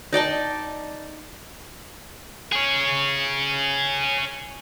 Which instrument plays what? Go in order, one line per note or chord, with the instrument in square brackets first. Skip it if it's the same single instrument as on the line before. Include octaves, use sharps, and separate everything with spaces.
[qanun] D#4 D5 G5 A5
[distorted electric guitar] G#4 C#5